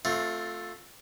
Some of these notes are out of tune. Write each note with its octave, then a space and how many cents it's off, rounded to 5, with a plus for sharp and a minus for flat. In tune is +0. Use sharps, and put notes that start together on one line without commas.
A3 +0 C4 +0 F4 +20